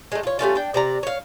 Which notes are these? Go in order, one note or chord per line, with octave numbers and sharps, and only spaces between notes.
G#3 A3
F4 C#5
G3 A3 C#4 F4
D4 G5
C3 D5 A#5
C#5 F5